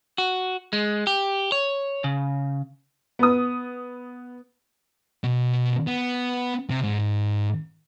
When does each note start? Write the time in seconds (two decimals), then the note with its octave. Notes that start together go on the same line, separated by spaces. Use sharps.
0.18 F#4
0.73 G#3
1.07 G4
1.52 C#5
2.04 C#3
3.19 B3 D#6
5.24 B2
5.87 B3
6.70 C3
6.83 G#2